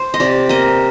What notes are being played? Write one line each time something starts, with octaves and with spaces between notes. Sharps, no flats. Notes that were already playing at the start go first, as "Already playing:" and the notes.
Already playing: C5
D#5
C3 D5
A#3 D#5